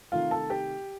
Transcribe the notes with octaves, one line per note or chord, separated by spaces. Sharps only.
C3 D#3 A3 F4 F5
A4 A5
G4 G5